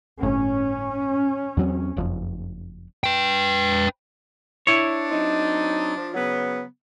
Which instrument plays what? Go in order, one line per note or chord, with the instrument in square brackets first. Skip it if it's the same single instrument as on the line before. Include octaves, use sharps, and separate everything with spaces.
[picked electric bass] G1 A2 [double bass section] C#4
[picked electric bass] E2 F#3 C4
F#1 F2
[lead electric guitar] B4 G5
[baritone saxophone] D4 [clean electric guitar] E4 C#5
[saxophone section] F#3 C4 D#4
F3
C#3 F#3 B3